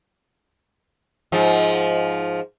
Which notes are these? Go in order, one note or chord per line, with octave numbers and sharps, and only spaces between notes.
G#2 F3